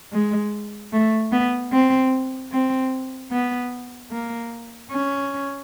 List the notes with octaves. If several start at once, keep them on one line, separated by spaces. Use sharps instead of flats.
G#3
A3
B3
C4
C4
B3
A#3
C#4